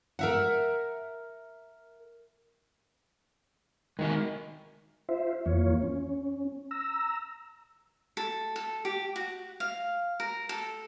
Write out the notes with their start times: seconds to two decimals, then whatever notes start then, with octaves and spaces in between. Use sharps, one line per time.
0.19 A#4 E5 F#5
3.99 D#3 G#3 F#4 G#5
5.09 F4 C5 E5
5.46 F2 E3 A#3 F4 C#5
5.83 C#4
6.71 A#5 E6
8.17 A4
8.56 A4
8.85 G4
9.16 F#4
9.60 F5
10.20 A#4
10.49 A4